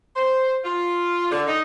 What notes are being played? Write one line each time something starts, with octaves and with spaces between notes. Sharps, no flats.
C5
F4
D3
D#4